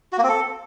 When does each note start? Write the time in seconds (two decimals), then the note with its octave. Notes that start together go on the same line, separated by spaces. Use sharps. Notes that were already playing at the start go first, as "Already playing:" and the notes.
0.13 F#4
0.18 A#3
0.23 C4
0.29 A4